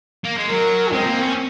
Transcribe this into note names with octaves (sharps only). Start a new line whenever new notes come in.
A#3
G#3
F#3 A#4
G#3 C4
A#3
C#4